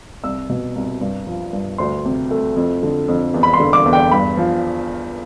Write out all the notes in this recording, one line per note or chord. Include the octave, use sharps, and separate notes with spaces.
C2 E6
B2
C2
G2
F3
G2
D2 C6
C3
A3
F2
D3
F2
E2
B5
C6
D3
D6
E2
G5
G2 B5
F3